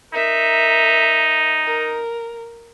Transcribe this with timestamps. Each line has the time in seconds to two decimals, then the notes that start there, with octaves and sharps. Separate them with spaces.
0.13 D#4 A#4 E5
1.66 A#4